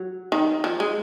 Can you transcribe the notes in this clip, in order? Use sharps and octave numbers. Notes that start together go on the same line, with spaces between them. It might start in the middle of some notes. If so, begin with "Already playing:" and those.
Already playing: F#3
D#3
F3
G#3